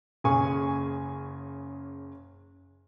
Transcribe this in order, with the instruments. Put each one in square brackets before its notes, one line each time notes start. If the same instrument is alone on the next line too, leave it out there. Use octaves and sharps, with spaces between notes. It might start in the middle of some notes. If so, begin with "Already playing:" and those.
[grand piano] F#1 C#3 G#4 G#5 C#6